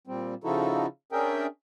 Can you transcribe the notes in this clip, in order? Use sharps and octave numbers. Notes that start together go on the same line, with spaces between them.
A#2 G3 C4
C#3 F3 D#4 E4 F#4 A4
C#4 D4 G#4 A#4 E5 G5